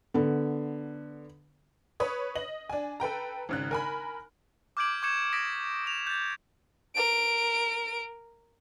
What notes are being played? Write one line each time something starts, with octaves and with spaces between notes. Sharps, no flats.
D3 B3
B4 C#5 D#6
D#5 F#7
D4 G#5
A4 B4 G5 A#5
G#1 C#3 F#6
A#4 G#5 B5
D6 F6 G6 G#6 D7 F#7
C#6 D6 G6 G#6 C#7 E7
D6 D#6 G#6 A#6 B6 D7
D#6 E7 F7
G6 A6
A#4 D7